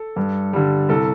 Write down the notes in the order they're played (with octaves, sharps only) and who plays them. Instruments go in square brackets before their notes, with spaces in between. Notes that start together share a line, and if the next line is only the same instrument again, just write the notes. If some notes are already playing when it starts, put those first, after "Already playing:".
Already playing: [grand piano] A4
G2
D3 G3
C2 A4